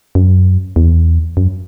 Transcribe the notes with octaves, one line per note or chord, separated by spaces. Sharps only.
F#2
E2
F#2